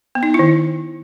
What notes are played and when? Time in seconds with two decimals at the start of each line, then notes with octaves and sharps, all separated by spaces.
0.15 B3
0.23 D#4
0.34 E4
0.39 D#3